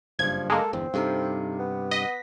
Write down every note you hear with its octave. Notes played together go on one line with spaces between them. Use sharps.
F#1 G2 F3 G#6
G#3 A#3 A4
G1 E2 C4
G2 C3 D#4 A4 F5
B3
D#5 F#5 A#6 B6